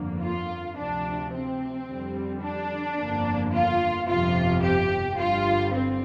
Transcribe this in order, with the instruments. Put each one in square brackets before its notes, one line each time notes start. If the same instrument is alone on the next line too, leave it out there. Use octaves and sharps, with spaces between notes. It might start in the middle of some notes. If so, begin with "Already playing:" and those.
Already playing: [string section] G1 F2 D3 A#3
F4
D2 C3 F3 D4
C4
F2 D3 G3
D4
G1 F2 D3 F3 A#3
F4
G1 F2 C3 F3 F4
G4
G1 G2 D3 G3 F4
C4